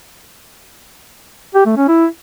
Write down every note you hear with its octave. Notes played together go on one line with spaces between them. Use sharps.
G4
A3
C#4
E4